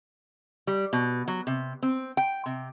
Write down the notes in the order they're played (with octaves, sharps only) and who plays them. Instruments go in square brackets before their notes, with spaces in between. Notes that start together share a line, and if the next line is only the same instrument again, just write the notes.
[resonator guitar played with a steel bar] G3
B2
F#3
C3
C4
G5
C3